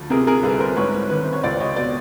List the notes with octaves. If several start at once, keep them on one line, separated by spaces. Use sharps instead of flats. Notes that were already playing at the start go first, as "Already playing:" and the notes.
Already playing: D2 F3
C3 G#4 A#4
G#4 A#4
C2 A4 B4
A#4 C5
G#2 B4 C#5
D#3 B4 C#5
C5
C#5
C#2 C5 D5
C#5 D#5
B2 C5 D5